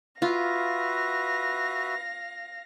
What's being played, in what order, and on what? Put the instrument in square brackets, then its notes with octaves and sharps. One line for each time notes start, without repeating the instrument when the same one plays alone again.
[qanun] F4 [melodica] F#4 B4 E5 [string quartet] F5 A#6